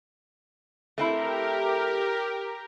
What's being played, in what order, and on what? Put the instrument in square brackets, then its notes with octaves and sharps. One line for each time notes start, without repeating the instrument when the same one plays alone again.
[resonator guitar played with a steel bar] A3 C4 E4 [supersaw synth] G4 A#4